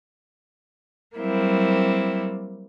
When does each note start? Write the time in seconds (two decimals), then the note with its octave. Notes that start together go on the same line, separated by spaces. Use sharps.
1.16 F#3 G3 A#3 C4 E4